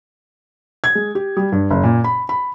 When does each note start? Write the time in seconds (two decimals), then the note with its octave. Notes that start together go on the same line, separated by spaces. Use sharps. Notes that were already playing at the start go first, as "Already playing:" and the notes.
0.84 G#6
0.95 G#3
1.15 G4
1.37 G3
1.52 G2
1.71 F#1
1.84 A#2
2.04 B5
2.29 B5